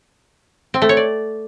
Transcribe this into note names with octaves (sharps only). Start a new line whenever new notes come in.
C4
A3
C#5
D5